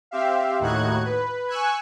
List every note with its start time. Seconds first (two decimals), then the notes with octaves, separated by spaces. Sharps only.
0.11 C4 G4 E5 F5
0.60 D#2 A2 D#4 F#4 F#6 G#6
1.05 B4
1.48 G#5 C#6 E6 F#6 G#6